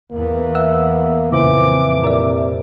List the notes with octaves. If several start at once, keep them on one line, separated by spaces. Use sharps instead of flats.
E2 E3 A#3 B3
E5 F#5 E6
F2 A#2 C#3 E3 E4 C5 D6
C3 A#4 D5 E5